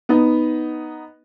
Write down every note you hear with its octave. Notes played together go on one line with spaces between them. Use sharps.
B3 D#4